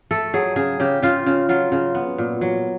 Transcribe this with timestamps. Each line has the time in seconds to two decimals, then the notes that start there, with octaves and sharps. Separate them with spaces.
0.11 A3 A4
0.34 F#3 G#4
0.56 C#3 G#4
0.80 C#3 G4
1.02 C#3 F4
1.26 C#3
1.49 F#3 F4
1.72 C#3
1.95 B3
2.18 A#2
2.41 F#3